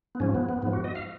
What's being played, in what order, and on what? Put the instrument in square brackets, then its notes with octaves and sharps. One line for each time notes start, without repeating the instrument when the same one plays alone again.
[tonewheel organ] B3
G#2 F3 C#4
B3
B3
G#2 F3 B3
F#4
D#5
F5